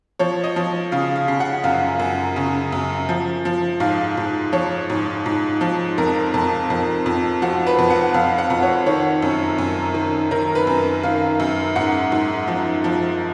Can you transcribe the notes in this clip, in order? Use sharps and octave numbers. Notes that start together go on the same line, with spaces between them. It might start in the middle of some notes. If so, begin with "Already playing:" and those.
F3 C#5
D#5
F3
C#3 F5
F5
C#3
F#5
F#2 F5
F#2
C#3
F#2
F3
F3
G#2 F5
G#2
F3 C#5
G#2
G#2
F3
F2 A#4
F2
F2
F2
F3 F#4
B4
F2
F#5
F2 F5
F#5
F2
C#5
D#3 C#5
F#2
F#2
D#3
D#3 A#4
B4
F#2
D#3 F5
F#2
G#2 F#5
G#2
F3
F3